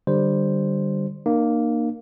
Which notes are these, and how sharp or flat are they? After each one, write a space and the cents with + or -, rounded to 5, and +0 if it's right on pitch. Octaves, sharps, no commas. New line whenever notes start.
D3 +30 G3 +0 C5 +0
A#3 +0 D#4 -45